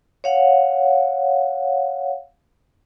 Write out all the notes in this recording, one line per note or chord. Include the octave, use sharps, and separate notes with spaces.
C#5 F5 F#5